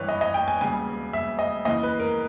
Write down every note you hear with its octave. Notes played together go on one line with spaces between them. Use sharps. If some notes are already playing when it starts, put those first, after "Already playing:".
Already playing: G#1 G2 E3 G3 B4 C#5
D#5
D#5
G5
G#5
E1 D#2 C#3 G3 G#5
E5
D#5
D#2 C#3 E3 G#3 D#5
B4
A#4